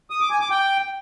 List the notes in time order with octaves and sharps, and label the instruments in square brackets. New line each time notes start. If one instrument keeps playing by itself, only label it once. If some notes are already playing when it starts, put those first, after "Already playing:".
[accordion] D#6
D6
G#5
D6
G5